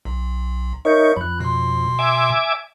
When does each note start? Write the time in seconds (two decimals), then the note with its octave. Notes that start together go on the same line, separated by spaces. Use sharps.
0.05 B1
0.85 D#4 A#4 C#5 E5 G6
1.17 F2 B5 F#6
1.40 B2 C6
1.99 E5 G#5 D6